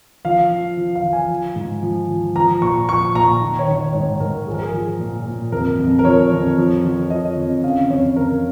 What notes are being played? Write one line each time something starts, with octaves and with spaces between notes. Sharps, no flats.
F3 F5
F3
F3
F5
F3
G#5
F3
G#2
F3
F3
F3 A#5
A#2 C#6
F3 C#6
A#2 A#5
D#3
C#5
D#3
C#5
G#2 C#5
G#2 A#4
F3 G#4
A#4
G#4
F3
A#2
A#2
F2 A#4
F2
A#4
F3 C#5
F2
F3
F3
F3 D#5
F2
C#3 F5
F2 C#5
F2 A#4